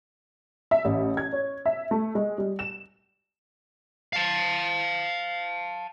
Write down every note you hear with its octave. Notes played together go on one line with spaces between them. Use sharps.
E5
A1
G#6
C#5
E5
A3
G#3
G3
E7
F5 A5